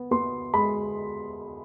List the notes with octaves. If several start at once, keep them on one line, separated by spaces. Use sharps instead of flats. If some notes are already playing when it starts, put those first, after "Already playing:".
Already playing: B3
B3 C6
G#3 B5